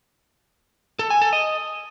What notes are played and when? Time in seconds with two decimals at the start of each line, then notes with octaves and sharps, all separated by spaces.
0.99 A4
1.10 G#5
1.22 A4
1.33 D#5